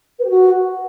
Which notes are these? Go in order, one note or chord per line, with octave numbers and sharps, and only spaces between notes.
B4
G4
F#4